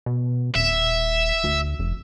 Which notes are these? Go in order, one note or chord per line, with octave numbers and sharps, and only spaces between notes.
B2
D#1 E5
D2
F1